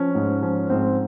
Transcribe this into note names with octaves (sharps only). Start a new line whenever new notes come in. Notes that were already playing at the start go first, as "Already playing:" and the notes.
Already playing: F3 C#4
G#2
F3 C#4
G#2 C4